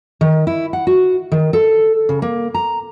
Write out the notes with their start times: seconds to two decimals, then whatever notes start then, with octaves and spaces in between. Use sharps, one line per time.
0.21 D#3
0.47 E4
0.73 F#5
0.87 F#4
1.32 D#3
1.53 A4
2.09 C#3
2.22 A#3
2.54 A#5